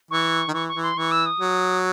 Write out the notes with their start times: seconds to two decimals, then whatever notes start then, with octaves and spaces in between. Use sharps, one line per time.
0.10 E3 C#6
0.48 D#3
0.53 E3 C#6
0.68 C#6
0.75 E3
0.82 C6
0.96 E3 C#6
1.11 E6
1.25 D#6
1.40 F#3